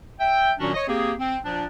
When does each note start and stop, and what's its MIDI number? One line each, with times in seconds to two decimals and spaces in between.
0.19 0.51 76
0.19 0.51 79
0.59 0.71 46
0.59 0.71 51
0.59 0.71 54
0.59 0.71 61
0.59 0.71 62
0.59 0.71 66
0.74 0.83 73
0.74 0.83 75
0.88 1.12 58
0.88 1.12 60
0.88 1.12 67
0.88 1.12 68
1.19 1.37 60
1.44 1.65 46
1.44 1.65 53
1.44 1.65 62